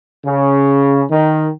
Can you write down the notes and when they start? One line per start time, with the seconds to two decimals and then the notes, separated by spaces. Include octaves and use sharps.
0.24 C#3
1.10 D#3